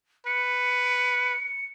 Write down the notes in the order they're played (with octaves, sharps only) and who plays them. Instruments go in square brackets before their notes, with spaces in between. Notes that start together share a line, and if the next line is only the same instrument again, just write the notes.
[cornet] B4 [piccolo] C#7